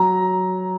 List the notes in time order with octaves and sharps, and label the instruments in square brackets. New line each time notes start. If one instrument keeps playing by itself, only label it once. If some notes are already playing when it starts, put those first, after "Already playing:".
Already playing: [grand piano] F#3 A#5